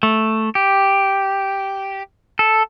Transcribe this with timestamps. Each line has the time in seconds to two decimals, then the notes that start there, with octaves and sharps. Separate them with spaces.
0.03 A3
0.55 G4
2.39 A4